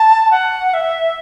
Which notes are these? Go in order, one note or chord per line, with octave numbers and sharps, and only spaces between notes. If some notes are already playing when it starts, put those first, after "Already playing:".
Already playing: A5
F#5
E5